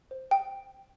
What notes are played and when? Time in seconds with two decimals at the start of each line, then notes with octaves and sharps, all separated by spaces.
0.11 C5
0.31 G5